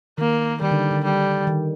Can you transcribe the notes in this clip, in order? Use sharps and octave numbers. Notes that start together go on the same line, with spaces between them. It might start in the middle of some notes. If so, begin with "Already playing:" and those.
D#3 A#3
D#3 G3
D3
D3
G3
D#3